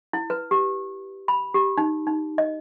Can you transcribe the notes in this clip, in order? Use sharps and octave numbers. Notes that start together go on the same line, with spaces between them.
E4
B4
G4
B5
G4
D#4
D#4
D#5